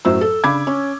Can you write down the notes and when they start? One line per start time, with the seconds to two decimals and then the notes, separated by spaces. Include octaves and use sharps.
0.05 F#2 A2 F#3 C5 E6
0.21 A4
0.44 C#3 D4 B5 D6 G#6
0.67 C#4